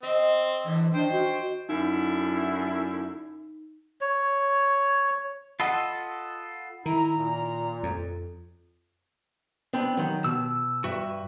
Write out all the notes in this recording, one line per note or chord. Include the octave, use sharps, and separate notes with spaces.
C4 D#5
G#2 D3 E3
D#3 D4 C5 G5
F#4
F#2 D3 D#4 E4
C#5
F4 A4 D#5 F#5 B5
D#3 E4 A#5
A#2
F2
B3 C4 D4
D#3 F#3
B2 E6
G2 F#4 B4 E5